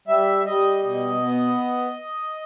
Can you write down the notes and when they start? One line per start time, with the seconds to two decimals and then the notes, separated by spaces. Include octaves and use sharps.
0.08 G3 E5
0.46 G3 D#5
0.84 B2 D#5
1.23 B3